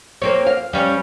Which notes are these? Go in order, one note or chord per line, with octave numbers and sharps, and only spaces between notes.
A#3 C4 C#5
F5
G3 C#4